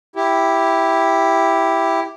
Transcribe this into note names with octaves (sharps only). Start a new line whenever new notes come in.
E4 G4